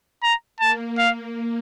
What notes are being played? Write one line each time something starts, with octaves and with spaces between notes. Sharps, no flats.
A#5
A#3 A5
A#3 F5